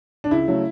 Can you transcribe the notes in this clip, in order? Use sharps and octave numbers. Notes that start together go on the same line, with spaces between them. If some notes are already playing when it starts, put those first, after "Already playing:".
D4
C#2 E4
C#3 F#3 A3